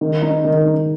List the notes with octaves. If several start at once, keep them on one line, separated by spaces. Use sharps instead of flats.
D#3
D#4
D#3
D#4